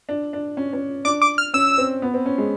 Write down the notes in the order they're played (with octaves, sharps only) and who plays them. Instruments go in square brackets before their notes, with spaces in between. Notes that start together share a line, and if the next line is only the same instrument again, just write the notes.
[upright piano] D4
D4
C#4
C#4
[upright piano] D4 [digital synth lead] D6
[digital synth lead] D6
F6
[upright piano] C#4 [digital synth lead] E6
[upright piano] C4
B3
C4
C#4
G#3